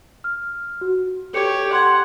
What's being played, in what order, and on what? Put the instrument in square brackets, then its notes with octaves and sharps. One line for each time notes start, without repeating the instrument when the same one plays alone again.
[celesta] F6
F#4
[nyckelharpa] G4 C#5 [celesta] A4 C#7
[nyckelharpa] F#5 [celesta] C6 G#6